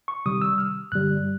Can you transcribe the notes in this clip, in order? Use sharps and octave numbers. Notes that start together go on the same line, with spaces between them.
C#6
C3 D#3 G3 D#6
E6
F6
G2 D3 G3 F#6